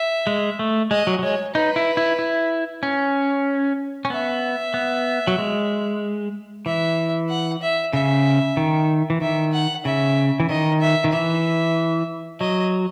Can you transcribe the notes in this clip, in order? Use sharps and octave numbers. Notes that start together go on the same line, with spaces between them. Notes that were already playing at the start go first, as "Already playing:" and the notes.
Already playing: E5
G#3
A3
G#3 D#5
F#3
F#3
G#3 C#5
D#4 B4
E4
E4
E4
C#4
C#4
B3 E5
B3
F#3
G#3
E3 E5
F#5
E5
C#3 E5
D#3
E3
D#3 E5
F#5
C#3 E5
E3
D#3 D#5
E5
D#3
E3 E5
F#3 D#5